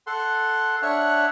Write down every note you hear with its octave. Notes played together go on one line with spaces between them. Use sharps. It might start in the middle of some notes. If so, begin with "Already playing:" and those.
A4 F#5 C6
D4 C#5 E5 F#5 F6 F#6